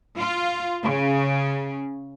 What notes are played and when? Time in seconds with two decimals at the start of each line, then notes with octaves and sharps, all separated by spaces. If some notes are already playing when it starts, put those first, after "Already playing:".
0.19 F4
0.85 C#3